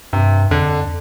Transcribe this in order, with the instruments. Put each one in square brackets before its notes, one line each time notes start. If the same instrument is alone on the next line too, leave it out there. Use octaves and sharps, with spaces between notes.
[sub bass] G2 [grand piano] C3
[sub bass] F2 [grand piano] D3